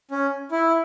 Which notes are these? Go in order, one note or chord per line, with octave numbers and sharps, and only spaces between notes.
C#4
E4